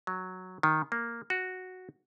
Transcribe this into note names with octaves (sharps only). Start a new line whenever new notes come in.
F#3
D#3
A#3
F#4